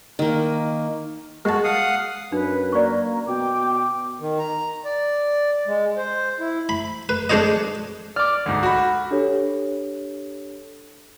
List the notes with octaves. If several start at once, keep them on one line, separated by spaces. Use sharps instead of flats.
D#3 A#3
G#3 F#4 A5
F5 F#5 D#6
F#2 D4 B4
A#3 D5 C#6
B2 G5 D6
D#3
A#5
D5
G#3
C5
E4
B5
B4
G#3 D4 A4 C5 C#5 D#5
D5 D6 F6
D2 G#2
F#4 B5
D4 G4 A4 C#5